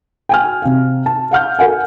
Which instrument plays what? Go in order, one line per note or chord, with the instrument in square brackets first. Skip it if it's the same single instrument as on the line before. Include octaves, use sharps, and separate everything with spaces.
[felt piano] G5 G#5 F6
C3 F5
A5
F5 F#5 F6 G6
A4 A#4 F#5 G#5